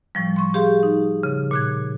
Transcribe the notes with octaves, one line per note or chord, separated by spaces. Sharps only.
A2 F3 G3
C6 C#6
G4 G#4 F5 C6
D#4
C#3
A#2 F#6 G#6